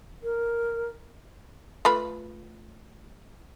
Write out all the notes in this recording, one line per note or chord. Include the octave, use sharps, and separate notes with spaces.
A#4
A3 F4 B4